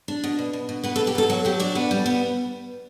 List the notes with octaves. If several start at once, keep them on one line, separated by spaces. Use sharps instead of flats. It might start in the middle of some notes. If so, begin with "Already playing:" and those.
D4
B2
B2
B2
B2
B3 B4
A4
B3
G4
F#3 A4
F#3 F#4
F#3 G4
D4 D5
B3
G3
B3